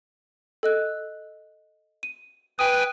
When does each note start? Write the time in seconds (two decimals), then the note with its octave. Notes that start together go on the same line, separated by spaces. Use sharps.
0.63 A4 D#5 F#6
2.03 D#7
2.59 B4 G5 G#5 D#6